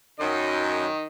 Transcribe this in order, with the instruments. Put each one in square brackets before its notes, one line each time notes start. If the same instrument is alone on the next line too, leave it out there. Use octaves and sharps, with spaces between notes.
[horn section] F#2 [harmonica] D#3 D#5